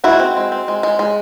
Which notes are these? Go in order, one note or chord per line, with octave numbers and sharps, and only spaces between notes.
G#3 E4 F#4
C4
G#3
C4
G#3
G#3
G#3